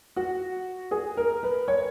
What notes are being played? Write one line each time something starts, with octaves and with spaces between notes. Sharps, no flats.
F#4
G#4
A#4
B4
C#5